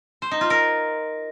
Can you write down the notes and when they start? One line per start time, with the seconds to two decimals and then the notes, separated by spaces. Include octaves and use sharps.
0.22 C5
0.31 D#4
0.41 F4
0.50 A#4